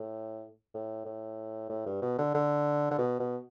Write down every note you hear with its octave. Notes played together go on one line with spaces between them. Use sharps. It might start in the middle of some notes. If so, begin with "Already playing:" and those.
Already playing: A2
A2
A2
A2
G2
B2
D3
D3
D3
B2
B2